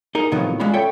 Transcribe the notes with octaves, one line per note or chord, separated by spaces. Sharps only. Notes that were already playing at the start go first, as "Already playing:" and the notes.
D#4 G#4 A#4
A2 C3 D#3 F3 F#3 B3
G#3 C#4 D4 F4 B5
A4 C#5 E5 G5